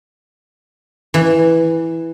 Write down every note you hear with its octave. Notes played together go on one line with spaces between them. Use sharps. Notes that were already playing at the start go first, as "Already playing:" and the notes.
E3